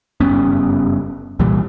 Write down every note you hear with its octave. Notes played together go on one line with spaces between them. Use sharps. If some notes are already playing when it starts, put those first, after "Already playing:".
F#1 G2 B3 C#4
C2 A#2 E3 G3